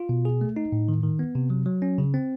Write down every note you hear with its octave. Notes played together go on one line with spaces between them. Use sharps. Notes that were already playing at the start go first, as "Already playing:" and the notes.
Already playing: F4
B2
G#4
A3
D#4
A2
D#3
D#3
B3
C3
F#3
F#3
C#4
C#3
C4